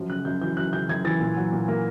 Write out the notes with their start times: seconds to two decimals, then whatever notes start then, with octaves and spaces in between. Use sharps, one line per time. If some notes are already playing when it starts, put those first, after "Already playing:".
Already playing: F#2 F3
0.09 C#3 F#6
0.25 F#2 G6
0.41 E3 G6
0.57 F#2 F#6
0.73 C#3 G6
0.89 F#2 G#6
1.05 E3 A6
1.20 A#2
1.36 F#3
1.53 A#2
1.68 A#3